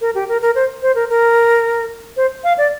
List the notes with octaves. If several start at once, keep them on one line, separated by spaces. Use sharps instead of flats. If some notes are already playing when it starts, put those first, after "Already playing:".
A#4
G4
A#4
A#4
C5
C5
A#4
A#4
C5
F5
D5